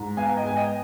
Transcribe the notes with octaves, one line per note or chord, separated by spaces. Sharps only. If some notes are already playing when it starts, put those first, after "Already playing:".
Already playing: G#2
B3 F5 G#5
D#5 G5
G#2 G#5
D#5 G5